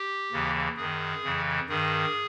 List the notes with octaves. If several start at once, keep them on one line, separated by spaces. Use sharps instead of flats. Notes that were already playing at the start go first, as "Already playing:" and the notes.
Already playing: G4
D#2 C#3 E3
F#2 D#3 G#4
F2 C#3 E3
G2 D#3 G#4